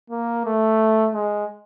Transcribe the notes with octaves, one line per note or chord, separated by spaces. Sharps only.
A#3
A3
G#3